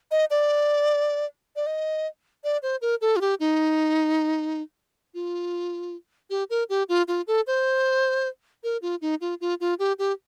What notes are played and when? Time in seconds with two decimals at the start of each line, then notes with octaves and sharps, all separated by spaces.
0.11 D#5
0.31 D5
1.56 D5
1.66 D#5
2.44 D5
2.63 C5
2.82 A#4
3.01 A4
3.16 F4
3.21 G4
3.40 D#4
5.14 F4
6.30 G4
6.50 A#4
6.70 G4
6.89 F4
7.08 F4
7.27 A4
7.47 C5
8.64 A#4
8.82 F4
9.02 D#4
9.21 F4
9.41 F4
9.61 F4
9.79 G4
9.99 G4